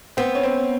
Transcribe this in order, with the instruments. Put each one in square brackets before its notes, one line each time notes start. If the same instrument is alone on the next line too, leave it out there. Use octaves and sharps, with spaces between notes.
[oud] B3 [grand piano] C4
[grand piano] C#4
C4